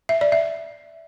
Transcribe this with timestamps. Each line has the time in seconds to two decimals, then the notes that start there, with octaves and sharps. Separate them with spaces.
0.09 E5
0.21 D5
0.32 E5